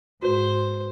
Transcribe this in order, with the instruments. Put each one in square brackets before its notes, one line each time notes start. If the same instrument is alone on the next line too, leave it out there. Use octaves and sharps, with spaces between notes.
[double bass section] G#2 [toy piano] F#4 [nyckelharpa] C5